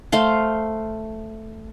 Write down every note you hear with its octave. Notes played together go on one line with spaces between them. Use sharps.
A3 C5 F5